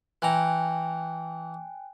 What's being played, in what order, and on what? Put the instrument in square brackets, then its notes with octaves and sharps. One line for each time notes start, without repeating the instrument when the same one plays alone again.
[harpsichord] E3 A#5 [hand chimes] G5 G#5 F#6